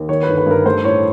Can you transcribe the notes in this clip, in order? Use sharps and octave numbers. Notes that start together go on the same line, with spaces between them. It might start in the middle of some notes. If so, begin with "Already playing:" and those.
Already playing: D#2
D#3 C#5
G1 B4
B4
G2 A#4
A3 C5
A2 C#5